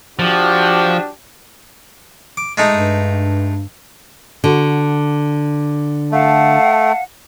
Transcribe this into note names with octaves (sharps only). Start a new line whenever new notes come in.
F3 D4 F#4 G4
D6
G#3 A3 D#4
G2
D3 F#4
A3 F5 F#5 A5